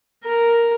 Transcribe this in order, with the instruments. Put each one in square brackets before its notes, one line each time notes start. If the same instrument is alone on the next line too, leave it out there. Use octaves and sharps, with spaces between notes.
[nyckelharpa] A#4